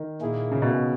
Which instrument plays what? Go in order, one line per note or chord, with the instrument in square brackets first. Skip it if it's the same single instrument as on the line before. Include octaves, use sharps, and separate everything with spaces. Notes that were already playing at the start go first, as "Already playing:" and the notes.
Already playing: [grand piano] D#3
[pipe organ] A#2 A#3 E4 G#4
[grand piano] C#3
B2